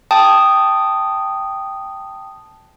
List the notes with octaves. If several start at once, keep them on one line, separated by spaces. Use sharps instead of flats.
G5 A5 D#6